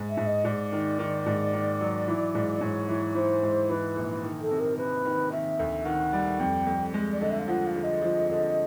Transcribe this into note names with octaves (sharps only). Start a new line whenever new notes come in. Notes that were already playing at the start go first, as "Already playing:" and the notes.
Already playing: G#2
E5
G#2
D#5
G#2 D5
D#3
D#3
G#2
D#3
F#3
E3
G#2
G#2 C#5
E3
C#5
E3 C5
G#2
E3 B4
A#1
D#3
A4
C3
A#4
C3 B4
D#3
D#3 E5
D2
D#3 F#5
G3
F2 G5
F2
G#3
D5
D3 D#5
E5
F5
F3 F#5
F5
D3
D#5
F3
D3